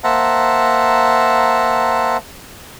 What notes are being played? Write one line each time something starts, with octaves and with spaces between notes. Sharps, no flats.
A#3 C5 E5 F#5 A5 A#5